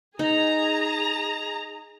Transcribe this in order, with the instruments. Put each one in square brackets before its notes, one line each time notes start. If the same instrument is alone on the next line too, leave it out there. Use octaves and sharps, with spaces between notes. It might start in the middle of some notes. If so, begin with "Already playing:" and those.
[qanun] D#4 [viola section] G#4 A#5